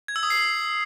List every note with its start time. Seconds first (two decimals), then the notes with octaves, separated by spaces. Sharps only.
0.08 G#6
0.16 E6
0.23 D#6
0.30 C7